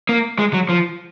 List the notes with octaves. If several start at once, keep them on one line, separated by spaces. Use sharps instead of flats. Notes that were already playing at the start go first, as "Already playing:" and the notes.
A#3
G#3
F#3
F3